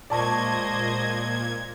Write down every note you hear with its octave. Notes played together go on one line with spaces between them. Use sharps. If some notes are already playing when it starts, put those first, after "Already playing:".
A#2 G#3 C5 D5 D#5 A5 C#6 G#6